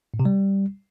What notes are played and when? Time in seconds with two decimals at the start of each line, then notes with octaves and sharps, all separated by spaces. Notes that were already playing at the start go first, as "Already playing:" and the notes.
0.14 A2
0.20 C3
0.25 G3